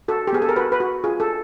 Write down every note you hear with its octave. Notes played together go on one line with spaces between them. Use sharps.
F#4 A4
G4
B3 G#4
A4
A#4
F#4 B4
B4
F#4
F4 G#4
A4